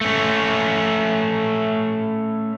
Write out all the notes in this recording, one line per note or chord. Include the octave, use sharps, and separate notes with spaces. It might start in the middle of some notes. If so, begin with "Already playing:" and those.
A3 C#4